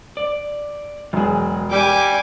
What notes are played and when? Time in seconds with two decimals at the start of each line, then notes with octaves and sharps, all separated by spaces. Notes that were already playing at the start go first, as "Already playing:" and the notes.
0.17 D5
1.13 E1 F#3 F#4 G#4
1.71 G3 G4 D5 G#5 D6